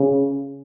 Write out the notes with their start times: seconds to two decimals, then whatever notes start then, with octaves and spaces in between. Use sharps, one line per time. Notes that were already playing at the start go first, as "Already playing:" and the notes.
Already playing: C#3